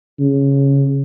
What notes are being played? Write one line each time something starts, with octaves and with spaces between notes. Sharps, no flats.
C#3